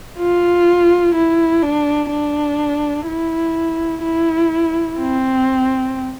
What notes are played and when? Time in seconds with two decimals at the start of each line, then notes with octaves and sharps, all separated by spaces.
0.19 F4
1.15 E4
1.63 D4
2.10 D4
3.07 E4
4.03 E4
4.99 C4